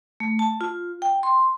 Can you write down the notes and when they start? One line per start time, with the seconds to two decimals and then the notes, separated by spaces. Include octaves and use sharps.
0.20 A3
0.39 A5
0.61 F4
1.02 G5
1.23 C6